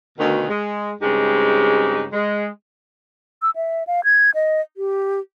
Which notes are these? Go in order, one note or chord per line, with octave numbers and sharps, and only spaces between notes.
D2 B2 D#3
G#3
G2 C#3 G#3 C4 D#4 G4
G#3
E6
E5
F5
G#6
D#5
G4